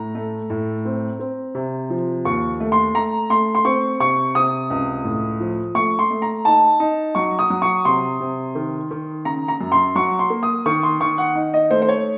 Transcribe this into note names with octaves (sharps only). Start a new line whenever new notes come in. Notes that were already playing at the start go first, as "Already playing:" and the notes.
Already playing: A2 A#5
A3
A2
C4
C4
C3
F3
D#2 C#6
A3
C6
A3 A#5
A3 C6
C6
C4 C#6
C3 C#6
C3 D#6
C#2
A2
F3
A3 C#6
C6
A3
A#5
D#4 A5
D#4
F#3 C#6
D#6
F#3
C#6
C3 C6
C3
D#3
D#3
C#3 A#5
A#5
F#2
C6
F#3 C#6
C6
A#3
D#6
D#3 C#6
C6
D#3 C#6
F#5
D#4
D#5
A3 C5
C5
C#5